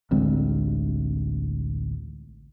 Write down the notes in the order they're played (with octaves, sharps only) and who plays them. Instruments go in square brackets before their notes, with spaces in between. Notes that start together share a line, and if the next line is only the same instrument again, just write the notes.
[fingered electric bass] A1 D2 G#3 C4